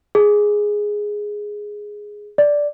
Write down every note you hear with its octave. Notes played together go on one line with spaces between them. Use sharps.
G#4
D5